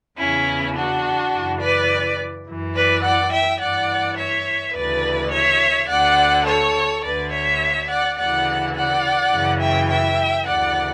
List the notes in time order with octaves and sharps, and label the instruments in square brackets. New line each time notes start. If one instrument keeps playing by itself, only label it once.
[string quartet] E2 C#3 E3 C#4 E4
D4 F#4
F#2 C#3 E3
B4 D5
F#2 E3
B4 D5
D5 F#5
E5 G5
G2 E3 D5 F#5
C#5 E5
D2 C#3 E3 B4 D5
C#5 E5
D2 D3 D5 F#5
A4 C#5
D2 D3 B4 D5
C#5 E5
D5 F#5
D2 C#3 E3 D5 F#5
D5 F#5
F#2 C#3 E3
E5 G5
E5 G5
D2 C#3 E3 D5 F#5